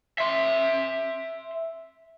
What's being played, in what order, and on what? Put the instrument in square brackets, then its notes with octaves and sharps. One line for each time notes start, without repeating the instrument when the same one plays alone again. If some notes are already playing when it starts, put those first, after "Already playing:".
[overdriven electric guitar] E5 C6